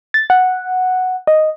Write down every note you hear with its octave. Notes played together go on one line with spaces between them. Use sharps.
A6
F#5
D#5